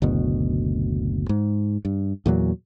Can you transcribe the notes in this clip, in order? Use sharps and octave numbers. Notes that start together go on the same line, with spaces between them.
F#1 D2 B2
G#2
G2
E2 A#2 D3 F#3